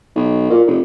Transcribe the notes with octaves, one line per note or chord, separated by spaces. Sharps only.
B1
A#2
F1